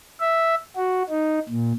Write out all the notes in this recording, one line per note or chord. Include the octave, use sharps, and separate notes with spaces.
E5
F#4
D#4
A#2